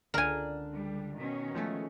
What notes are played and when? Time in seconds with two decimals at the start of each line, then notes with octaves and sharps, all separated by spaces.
0.14 C#2 D3 D4 A#4 G#5
0.73 G3
1.16 B2 D#3 C#4
1.55 F3 G#3 A3